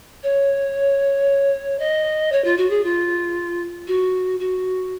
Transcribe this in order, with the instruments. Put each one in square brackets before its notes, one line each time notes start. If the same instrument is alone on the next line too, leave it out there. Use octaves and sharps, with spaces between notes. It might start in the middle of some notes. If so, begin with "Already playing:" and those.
[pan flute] C#5
D#5
C#5
F4
F#4
G#4
F4
F#4
F#4